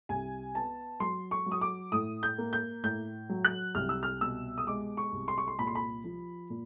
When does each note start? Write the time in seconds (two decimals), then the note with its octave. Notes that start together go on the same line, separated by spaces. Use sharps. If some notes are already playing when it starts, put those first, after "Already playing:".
0.09 C2 G#5
0.55 B3 A5
1.00 F#3 C6
1.31 C#6
1.46 F#3
1.52 D#6
1.61 D6
1.92 A2 D#6
2.23 G6
2.38 A#3
2.53 G6
2.83 A2 G6
3.29 F#3
3.45 F#6
3.75 C2 F6
3.89 E6
4.03 F6
4.21 B2 E6
4.58 D#6
4.67 G#3 D6
4.97 C#6
5.12 C2
5.28 C6
5.38 C#6
5.48 C6
5.59 A#2 B5
5.67 C6
5.75 B5
6.04 F3
6.50 A#2